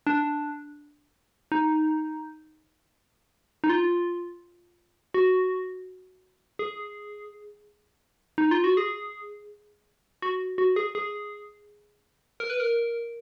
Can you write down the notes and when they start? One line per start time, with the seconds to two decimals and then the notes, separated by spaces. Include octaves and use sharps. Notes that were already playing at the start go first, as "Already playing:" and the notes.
0.07 D4
1.52 D#4
3.64 D#4
3.69 F4
5.14 F#4
6.59 G#4
8.38 D#4
8.51 F4
8.64 F#4
8.77 G#4
10.22 F#4
10.58 F#4
10.76 G#4
10.95 G#4
12.40 A#4
12.50 B4
12.60 A#4